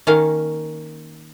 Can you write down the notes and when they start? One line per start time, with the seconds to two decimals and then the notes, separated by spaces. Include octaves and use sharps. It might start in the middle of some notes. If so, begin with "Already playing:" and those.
0.07 D#3 A#3 C#4 F5